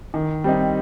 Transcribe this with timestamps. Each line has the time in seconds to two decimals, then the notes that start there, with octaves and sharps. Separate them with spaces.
0.14 D#3
0.44 G3 C4 D#4